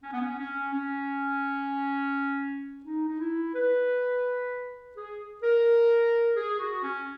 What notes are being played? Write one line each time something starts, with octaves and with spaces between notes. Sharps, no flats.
C#4
B3
C#4
C#4
C#4
D#4
D#4
E4
B4
G#4
A#4
G#4
F#4
C#4